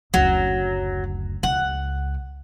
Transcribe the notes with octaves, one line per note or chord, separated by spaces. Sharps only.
F#1 D2 F#3
C#2 F#5